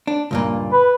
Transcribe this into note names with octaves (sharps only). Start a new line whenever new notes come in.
D4
C#2 G2 A#2
B4